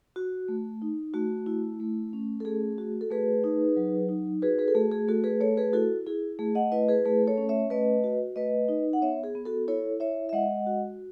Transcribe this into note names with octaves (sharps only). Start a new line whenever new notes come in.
F#4
A3
D#4
A3 F#4
E4
A3
C#4
A4
A3 G#4
F#4
A4
A3 G#4 B4
D#4
F#3
D#4
F#4 G#4 B4
G#4 B4
A4
A3 G#4
G#4
A3 F#4 A4
G#4 B4
A3 A4 C#5
G#4 B4
E4 F#4 A4
E4 G#4
A3 G#4
D#5 F#5
E4 B4 D#5
G#4 B4
A3 G#4 B4
A4 C#5
C#4
C#5 E5
A3 B4 D#5
F#4
A3 B4 D#5
D#4
F#5
B3 C#5 E5
G#4
B3
F#4 A4
E4 A4 C#5
E4 C#5 E5
E5
G#3 D#5 F#5
F#4